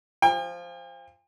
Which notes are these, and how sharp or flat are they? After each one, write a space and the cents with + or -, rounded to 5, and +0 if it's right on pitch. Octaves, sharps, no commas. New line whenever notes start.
F3 +0 G5 +45